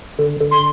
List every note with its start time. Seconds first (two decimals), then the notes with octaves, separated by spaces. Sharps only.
0.19 D3
0.41 D3
0.51 C6